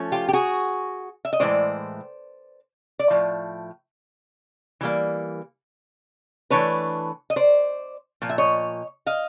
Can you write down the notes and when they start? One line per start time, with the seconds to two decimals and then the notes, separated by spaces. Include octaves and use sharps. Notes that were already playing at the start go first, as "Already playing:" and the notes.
Already playing: F3 A3 C#4
0.12 F4 G4
0.29 G4
0.33 F#4 G#4
1.25 E5
1.33 D#5
1.40 A2 E3 G#3 C5 D5
2.99 D5
3.10 A2 F3
4.81 E3 G3 A#3
6.50 E3 A3 D4 B4 C#5
7.30 D#5
7.36 C5 D5
8.22 A#2 F3
8.29 E5
8.38 C#5 D#5
9.06 D#5 F5